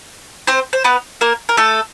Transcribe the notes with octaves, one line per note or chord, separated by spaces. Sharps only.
C4 C5
C5
B3 B4
A#3 A#4
A#4
A3 A4